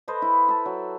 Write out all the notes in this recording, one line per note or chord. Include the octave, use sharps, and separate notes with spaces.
A4 B4 C5 D#5
E4
E5 A5
F#3